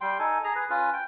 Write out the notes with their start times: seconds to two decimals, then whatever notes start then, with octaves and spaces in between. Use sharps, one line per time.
0.01 G3 G5 C6
0.19 D#4 A4 G#5
0.44 G#4 A#5
0.55 G#4 B4
0.70 C#4 F4 B4
0.93 G5